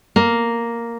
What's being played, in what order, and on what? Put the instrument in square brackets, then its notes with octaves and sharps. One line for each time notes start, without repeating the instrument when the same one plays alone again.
[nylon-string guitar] A#3